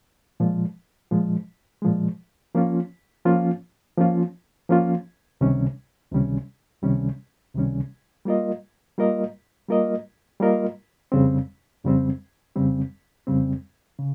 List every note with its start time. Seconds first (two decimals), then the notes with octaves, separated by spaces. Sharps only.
0.40 A#2 F3 G#3
1.11 A#2 F3 G#3
1.82 A#2 F3 G#3
2.55 F3 A#3 C#4 F4
3.25 F3 A#3 C#4 F4
3.97 F3 A#3 C#4 F4
4.69 F3 A#3 C#4 F4
5.41 C#2 C3 D#3 G3 C#4
6.11 C#2 C3 D#3 G3 C#4
6.83 C#2 C3 D#3 G3 C#4
7.55 C#2 C3 D#3 G3 C#4
8.26 G3 A#3 F4 A#4 D#5
8.98 G3 A#3 F4 A#4 D#5
9.69 G3 A#3 F4 A#4 D#5
10.40 G3 A#3 F4 A#4 D#5
11.12 F2 C#3 G3 C4
11.84 F2 C#3 G3 C4
12.56 F2 C#3 G3 C4
13.27 F2 C#3 G3 C4
13.99 C#3